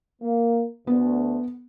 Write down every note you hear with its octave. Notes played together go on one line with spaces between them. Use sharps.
A#3
D2 B3